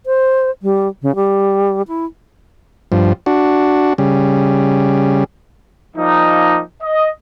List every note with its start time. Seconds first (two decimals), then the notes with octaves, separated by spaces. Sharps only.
0.06 C5
0.62 G3
1.02 C#3
1.16 G3
1.88 E4
2.92 G2 F3
3.26 D4 F#4
3.98 C#3 G3
5.97 F3 G3 A#3 D#4
6.82 D#5